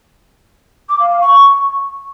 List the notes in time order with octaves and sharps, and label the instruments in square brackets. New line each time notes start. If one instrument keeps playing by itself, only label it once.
[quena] D6
F5
F5
C#6